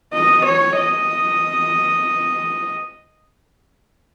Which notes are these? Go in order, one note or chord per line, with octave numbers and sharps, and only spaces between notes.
D#5
C#5
D#5